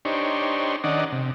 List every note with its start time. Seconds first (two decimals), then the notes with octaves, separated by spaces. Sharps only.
0.05 D4 D#4 G4 C5 C#5
0.84 D#3 C#4 D4 D5 D#5 F#5
1.12 C3